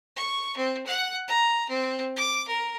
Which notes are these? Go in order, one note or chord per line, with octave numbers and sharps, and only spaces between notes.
C#6
C4
F#5
A#5
C4
D6
A#4